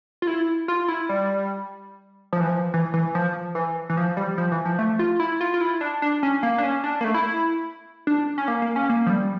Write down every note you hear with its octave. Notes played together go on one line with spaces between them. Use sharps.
F4
E4
F4
E4
G3
F3
E3
F3
E3
E3
F3
E3
E3
F3
G3
F3
E3
F3
A3
F4
E4
F4
F4
E4
D4
D4
C#4
A#3
D4
C#4
D4
A#3
A3
E4
D4
C#4
A#3
A#3
C#4
A#3
F3
G3